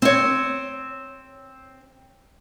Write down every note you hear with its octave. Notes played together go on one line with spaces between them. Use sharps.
C4 C#5